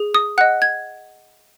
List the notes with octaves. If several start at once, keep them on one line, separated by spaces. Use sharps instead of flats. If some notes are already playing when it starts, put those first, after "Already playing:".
Already playing: G#4
D#6
D#5 F#5 F#6
G#6